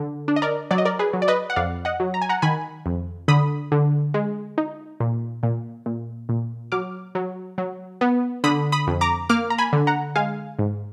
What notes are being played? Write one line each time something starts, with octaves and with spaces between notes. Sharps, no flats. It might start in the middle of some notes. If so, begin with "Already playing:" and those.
Already playing: D3
D4
D#5
A#4 D5
F#3 D5
D#5
A#4 D5
G#4 B4
F#3
D5
B4 D#5
F#5
F2 D5 F5
D#5 F#5
F#3
A#5
G#5
F#5 A#5
D#3 G#5 B5
F2
D3 B5 D#6
D3
G#3
D#4
A#2
A#2
A#2
A#2
F#3 D6 F6
F#3
F#3
B3
D3 B5 D#6
B5 D#6
F2
A#5 D6
A#3 D6 F6
A#5
G#5 B5
D3
F#5 A#5
G#3 F5 G#5
G#2